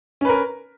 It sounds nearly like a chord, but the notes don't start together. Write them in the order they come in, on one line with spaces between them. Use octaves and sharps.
C#4 B4 A#4